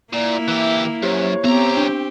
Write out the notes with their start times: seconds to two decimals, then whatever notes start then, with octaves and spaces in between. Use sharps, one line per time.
0.13 A#2 A#3 E4 D5
0.48 E3 G4 E5
1.03 F#2 G4 C5 C#5
1.44 C2 B3 C4 G4 A#5
1.77 D4